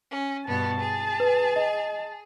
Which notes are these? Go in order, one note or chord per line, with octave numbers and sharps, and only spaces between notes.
C#4
G2 B2 B3 A5
G#4
B4
D#5